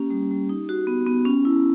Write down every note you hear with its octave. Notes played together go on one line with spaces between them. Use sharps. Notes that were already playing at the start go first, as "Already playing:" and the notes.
Already playing: A#3 C#4 G4
G3
G3
D#4
F#4
B3
B3
C#4
E4